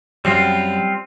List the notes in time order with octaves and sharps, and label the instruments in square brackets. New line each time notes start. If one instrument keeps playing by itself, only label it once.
[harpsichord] F#2 [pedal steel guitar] G3 C4 F4